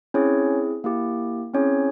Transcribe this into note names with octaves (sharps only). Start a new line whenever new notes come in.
C4 C#4 E4 G#4 C#5
A#3 E4 G4
C4 C#4 E4 G#4 C#5